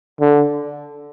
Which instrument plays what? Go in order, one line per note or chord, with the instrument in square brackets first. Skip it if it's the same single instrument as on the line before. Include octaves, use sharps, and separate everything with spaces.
[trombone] D3